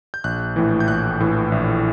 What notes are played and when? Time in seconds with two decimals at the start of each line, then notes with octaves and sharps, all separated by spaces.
0.14 G6
0.24 A#1 F#6
0.56 A2 E3
0.80 G6
0.88 A#1 F#6
1.20 A2 E3
1.52 A#1